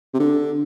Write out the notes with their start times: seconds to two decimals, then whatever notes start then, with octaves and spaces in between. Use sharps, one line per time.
0.14 C3
0.20 D3